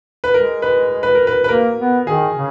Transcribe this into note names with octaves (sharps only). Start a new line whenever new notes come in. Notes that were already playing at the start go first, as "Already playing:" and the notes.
B4
G#3 A#4
B4
B4
A#4
B4
B4
A#3 A#4
B3
D#3 G#4
C#3